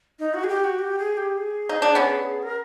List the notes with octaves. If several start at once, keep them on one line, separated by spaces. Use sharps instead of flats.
D#4
F#4
G#4
G4
F#4
G4
G#4
G4
G#4
D#4
D4
B3 C#4
A#4